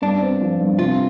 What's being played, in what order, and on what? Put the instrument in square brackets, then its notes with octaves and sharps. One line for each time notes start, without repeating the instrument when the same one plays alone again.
[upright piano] G2 [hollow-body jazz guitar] D4
[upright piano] C4
F3
G2
[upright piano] C3 [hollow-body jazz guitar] F4